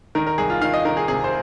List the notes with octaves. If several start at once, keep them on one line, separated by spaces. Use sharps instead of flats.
D#3 A#4
A#4
C2 G#4
F4
D#3 F5
D#5
D#3 A#4
G#4
C3 G#4
C5